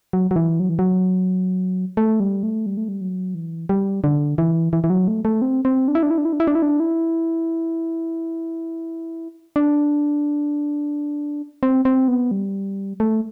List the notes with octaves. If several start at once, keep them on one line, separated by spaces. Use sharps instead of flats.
F#3
F#3
E3
F#3
E3
F#3
A3
G3
A3
G3
A3
G3
F#3
E3
G3
D3
E3
E3
E3
F#3
A3
A3
C4
C4
D4
E4
D4
E4
D4
E4
D4
E4
D4
E4
D4
E4
D4
C4
C4
B3
G3
A3